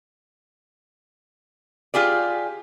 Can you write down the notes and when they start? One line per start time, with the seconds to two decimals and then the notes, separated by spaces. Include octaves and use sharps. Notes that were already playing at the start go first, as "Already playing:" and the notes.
1.94 F4 G4 G#4 D5